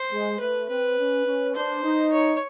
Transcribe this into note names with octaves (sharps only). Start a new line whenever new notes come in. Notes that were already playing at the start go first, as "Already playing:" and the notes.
Already playing: C5
G#3
A3 B4
C4 B4
C#4
C#4
D4 C5
D#4
C#5